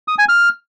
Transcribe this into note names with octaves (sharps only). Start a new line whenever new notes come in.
D#6
G#5
F6